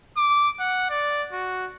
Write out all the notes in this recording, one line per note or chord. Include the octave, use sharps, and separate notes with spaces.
D6
F#5
D5
F#4